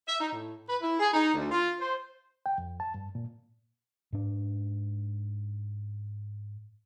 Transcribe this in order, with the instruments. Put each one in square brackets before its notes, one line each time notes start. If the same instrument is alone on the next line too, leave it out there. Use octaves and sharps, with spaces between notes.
[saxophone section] E5
D#4
A2
B4
E4
G#4
D#4
D2
F4
C5
[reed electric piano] G5
F2
A5
G2
A#2
[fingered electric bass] G#2 D4